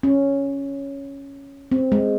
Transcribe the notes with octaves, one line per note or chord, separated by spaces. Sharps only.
C#4
C4
G#3